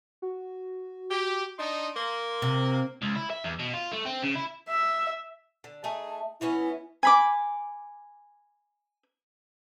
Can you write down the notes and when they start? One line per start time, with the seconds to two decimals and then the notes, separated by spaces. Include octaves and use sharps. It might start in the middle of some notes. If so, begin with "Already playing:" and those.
0.22 F#4
1.11 G4
1.58 D4 D#4 C6
1.96 A#3
2.42 C3
3.02 C#2
3.15 E4
3.30 E5
3.44 E2
3.59 B2
3.74 F4
3.91 A3
4.05 C4
4.22 C#3
4.35 E4
4.69 E5
5.64 D3
5.84 A3 D#4 G#4 A5
6.41 E3 B3 C#4 E4
7.03 G#5 B5 D6